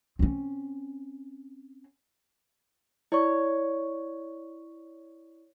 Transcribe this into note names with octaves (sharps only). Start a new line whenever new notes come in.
C4 C#4
E4 C#5 D5 C#6